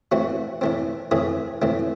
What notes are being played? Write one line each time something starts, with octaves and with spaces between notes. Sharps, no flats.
A2 E3 A3 C4 F#4
A2 E3 A3 C4
A2 E3 A3 C4 G#4
A2 E3 A3 C4